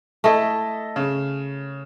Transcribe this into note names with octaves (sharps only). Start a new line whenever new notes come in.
A3 E4 A4 D#5 E5
C#3